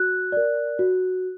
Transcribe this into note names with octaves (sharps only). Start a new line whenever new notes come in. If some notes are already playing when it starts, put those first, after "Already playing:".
Already playing: F#4 F#6
A#4 D5
F#4